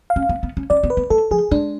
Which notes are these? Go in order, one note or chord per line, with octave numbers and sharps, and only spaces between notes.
F5
C#4
B3
B3
C#4
C#4 D5
B3
B4
B3
A3 A4
F3 G#4
G#3 D4